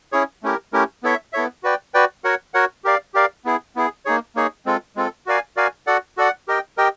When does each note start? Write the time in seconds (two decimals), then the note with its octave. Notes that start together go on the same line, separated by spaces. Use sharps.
0.12 C#4 E4 G#4 C#5
0.43 A3 C#4 E4 G4 A#4
0.73 A3 C#4 E4 G4 A#4
1.03 B3 E4 A4 C#5 E5
1.33 B3 E4 A4 C#5 E5
1.63 F#4 B4 D5 G5
1.94 F#4 B4 D5 G5
2.24 F#4 A#4 C#5 F#5
2.54 F#4 A#4 C#5 F#5
2.84 G4 A#4 D5 F5
3.14 G4 A#4 D5 F5
3.45 B3 E4 G#4
3.76 B3 E4 G#4
4.05 A#3 D#4 G#4 C#5
4.36 A#3 D#4 G#4 C#5
4.66 G#3 C4 F4 A4
4.96 G#3 C4 F4 A4
5.26 F#4 A#4 D5 F5 G#5
5.57 F#4 A#4 D5 F5 G#5
5.87 F#4 A4 D5 F#5
6.17 F#4 A4 D5 F#5
6.48 G4 A#4 D#5 G5
6.77 G4 A#4 D#5 G5